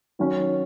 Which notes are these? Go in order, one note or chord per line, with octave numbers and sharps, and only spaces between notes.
D#3 F#3 C#4